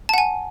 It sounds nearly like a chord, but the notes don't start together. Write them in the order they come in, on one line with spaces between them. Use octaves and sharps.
A5 F#5 G#5